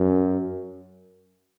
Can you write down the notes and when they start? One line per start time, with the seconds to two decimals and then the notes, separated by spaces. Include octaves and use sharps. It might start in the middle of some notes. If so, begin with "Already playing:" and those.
Already playing: F#2